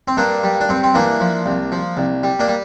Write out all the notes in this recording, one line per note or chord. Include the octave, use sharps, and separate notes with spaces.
C4
G2 A#3 D4
G3
D4
G2 C4
C4
E3 A#3 D4
F3
C2
F3
C2
G3
A#3 D4
G3